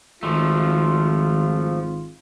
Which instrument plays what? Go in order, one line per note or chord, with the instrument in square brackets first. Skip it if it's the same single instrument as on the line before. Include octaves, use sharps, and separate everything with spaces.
[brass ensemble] G#1 F4 [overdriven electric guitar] F3 A3